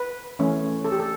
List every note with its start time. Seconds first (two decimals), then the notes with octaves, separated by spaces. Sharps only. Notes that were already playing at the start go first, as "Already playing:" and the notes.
Already playing: B4
0.39 E3 A3 C#4
0.85 A4
0.92 G4
1.00 A4